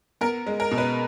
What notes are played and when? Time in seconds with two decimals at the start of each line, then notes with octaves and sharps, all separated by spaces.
0.21 B3 A#4
0.46 G#3
0.60 A#4
0.71 B2
0.78 B4